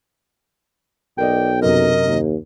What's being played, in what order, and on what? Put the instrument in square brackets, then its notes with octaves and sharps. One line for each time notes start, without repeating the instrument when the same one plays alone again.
[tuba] B1 [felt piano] A#4 D5 D#5 [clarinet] G5
[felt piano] F#2 C3 [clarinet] A#4 [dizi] D#5
[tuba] D#2